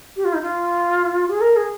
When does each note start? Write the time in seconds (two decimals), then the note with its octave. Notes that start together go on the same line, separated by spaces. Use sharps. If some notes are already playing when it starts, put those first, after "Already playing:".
0.16 G4
0.24 F4
0.33 D#4
0.42 F4
1.29 G#4
1.41 A#4
1.56 G#4